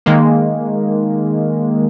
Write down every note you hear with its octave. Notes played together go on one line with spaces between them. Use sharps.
D#3 G#3 A#3